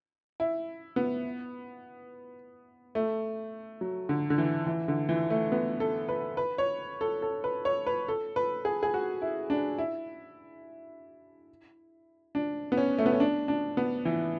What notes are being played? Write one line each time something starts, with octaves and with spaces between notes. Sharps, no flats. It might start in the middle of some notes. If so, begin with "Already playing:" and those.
E4
B3
A3
F#3
D3
D3
E3
E3
D3
E3
A3
B3
A4
B4
B4
C#5
A4
A4
B4
C#5
B4
A4
B4
G#4
G#4
F#4
E4
D4
E4
D4
B3
C#4
A3
B3
C#4
D4
D4
B3
E3